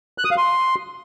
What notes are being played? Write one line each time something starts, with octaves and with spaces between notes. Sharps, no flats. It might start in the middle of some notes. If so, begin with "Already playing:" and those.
F#6
D#6
F5
C6